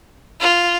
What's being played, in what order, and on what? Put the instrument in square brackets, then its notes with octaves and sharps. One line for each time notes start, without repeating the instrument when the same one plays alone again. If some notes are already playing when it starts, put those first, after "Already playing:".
[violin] F4